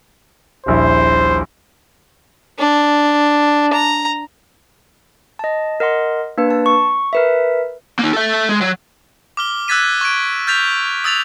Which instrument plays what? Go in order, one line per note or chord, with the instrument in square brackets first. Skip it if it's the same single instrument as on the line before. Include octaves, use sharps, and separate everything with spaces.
[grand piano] D#1 A#1 E4 [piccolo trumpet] C5
[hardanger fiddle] D4
A#5
[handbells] D#5 A5
A#4 D#5 F#5 C6
A#3 D4 B4
A5
C#6
A#4 B4 E5
[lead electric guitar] A#3 D#4
A4 E5
G#3
F#3
[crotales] D6 F6 G7
E6 F#6 G#6 A6 B6 D#7
C#6 G#6 D7
F6 G6 A6 B6 F7
D#6 E6 A6 F7